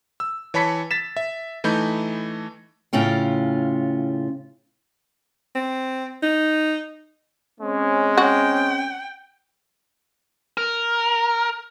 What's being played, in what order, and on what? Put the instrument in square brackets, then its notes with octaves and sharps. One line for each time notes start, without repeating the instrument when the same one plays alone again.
[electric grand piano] E6
E3 C#5 A5 B5 B6 C#7
A6 B6 E7
E5
E3 A3 D#4 B5 G6
[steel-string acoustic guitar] A2 C#3 C#4 F4 G5
[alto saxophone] C4
D#4
[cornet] G#3 [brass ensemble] C4 C#4
[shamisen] F#4 [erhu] G5
[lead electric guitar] A#4